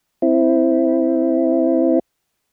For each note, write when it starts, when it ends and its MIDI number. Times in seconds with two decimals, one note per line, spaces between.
0.22 1.99 60
0.22 1.99 64